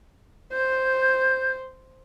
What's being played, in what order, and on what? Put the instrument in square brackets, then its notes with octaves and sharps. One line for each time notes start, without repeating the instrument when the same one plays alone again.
[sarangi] C5 [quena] G6